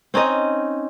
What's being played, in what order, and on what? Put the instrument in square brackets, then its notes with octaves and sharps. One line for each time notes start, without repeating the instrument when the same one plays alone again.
[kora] C4 C#4 D#4 D#5